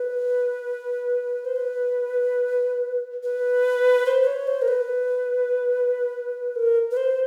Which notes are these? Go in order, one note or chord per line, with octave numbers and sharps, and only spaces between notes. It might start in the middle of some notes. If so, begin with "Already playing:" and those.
Already playing: B4
C5
B4
B4
C5
C5
C#5
C5
A#4
B4
A#4
B4
C5